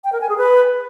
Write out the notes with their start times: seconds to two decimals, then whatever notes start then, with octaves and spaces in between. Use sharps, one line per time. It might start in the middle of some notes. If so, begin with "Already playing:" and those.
0.04 G5
0.13 A#4
0.21 G#5
0.29 G#4
0.38 B4